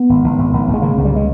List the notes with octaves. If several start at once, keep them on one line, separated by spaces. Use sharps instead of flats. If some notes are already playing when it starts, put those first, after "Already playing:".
Already playing: B3
G#1
G#1
G#1
G#1
G#1
G#3
C#3 A#3
C#2
G3
C#3 G#3